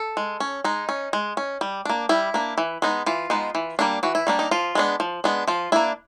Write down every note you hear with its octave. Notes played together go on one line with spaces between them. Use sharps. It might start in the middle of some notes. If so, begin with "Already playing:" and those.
Already playing: A4
G#3
C#4
G#3 D#4
C#4
G#3
C#4
G3
A#3 D4
G3 E4
A#3 D4
E3
G#3 B3 D#4
E3 F4
G#3 B3 D#4
E3
G3 A#3 D4
E3 F#4
E4
G3 A#3 D4
D#4
F3 F4
G#3 B3 D4
F3
G#3 B3 D4
F3 F4
A#3 D4 E4